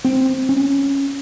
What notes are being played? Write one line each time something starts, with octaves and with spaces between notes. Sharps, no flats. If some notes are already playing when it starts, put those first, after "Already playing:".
C4
C#4